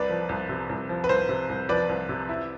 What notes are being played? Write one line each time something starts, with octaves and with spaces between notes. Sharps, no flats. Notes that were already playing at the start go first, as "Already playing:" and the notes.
Already playing: C2 B4 D5
F3
C2
C3
C2
F3
B4
C2 C5
C3
C2
F3 B4 D5
C2
C3
E4